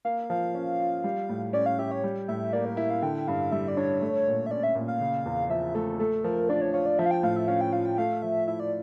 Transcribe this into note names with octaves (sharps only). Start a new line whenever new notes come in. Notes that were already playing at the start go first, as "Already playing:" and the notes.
A#3 F5
F3 F5
C#4
F4
G3
A2
C#4 D5
F5
G4 E5
C#5
G3
A2 E5
A#3 D5
A#4
E4 E5
F5
D3 G5
G2 F5
G3 E5
D5
D4 C#5
A3
A#2
E5
C#4 D5
E5
A#2
F5
C#3
E2
F3 E5
A3 A4
A3 A4
F3 A#4
D4 D5
C#5
F4 C#5
D5
F3 E5
F5
G5
A2 F5
E5
C#4 F5
G5
F4 F5
G5
A3 F5
F3 E5
E4 E5
D5